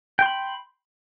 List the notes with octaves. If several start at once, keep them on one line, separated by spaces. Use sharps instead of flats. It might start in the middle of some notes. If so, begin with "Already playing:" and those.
G5 B5 C6